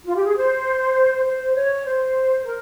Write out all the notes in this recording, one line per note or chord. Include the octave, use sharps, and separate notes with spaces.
F4
G4
G#4
C5
C5
C#5
C5
A#4